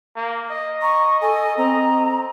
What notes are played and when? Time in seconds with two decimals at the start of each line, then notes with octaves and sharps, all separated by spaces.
0.16 A#3
0.50 D#5
0.82 A#5 C#6
1.22 A4 G#5
1.57 C4 A#5